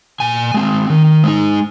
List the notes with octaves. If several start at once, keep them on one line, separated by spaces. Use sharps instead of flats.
A#2 G#5
G#3 C4
D#3
G#3 D#4